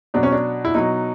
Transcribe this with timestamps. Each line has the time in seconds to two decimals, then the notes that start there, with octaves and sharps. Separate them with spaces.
0.14 B2 F#3 D4
0.23 C#4
0.32 D4
0.65 E4
0.75 B2 F#3 D#4